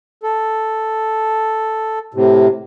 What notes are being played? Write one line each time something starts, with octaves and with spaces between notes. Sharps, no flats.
A4
A2 C3